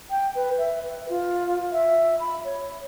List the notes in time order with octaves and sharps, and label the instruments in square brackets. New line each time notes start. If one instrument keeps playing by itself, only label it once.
[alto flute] G5
B4
E5
B4
F4
E5
B5
C#5